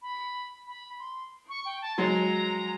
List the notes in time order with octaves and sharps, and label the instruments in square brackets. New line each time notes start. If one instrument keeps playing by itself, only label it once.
[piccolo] B5
B5
C6
C#6
G5
A5
[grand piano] F#3 G#3 [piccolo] A#5